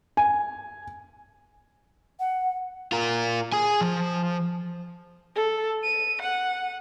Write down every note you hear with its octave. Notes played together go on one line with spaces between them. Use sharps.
G#5
F#5
F4 A#4
G#4 G#5
F3
A4
D#7
F#5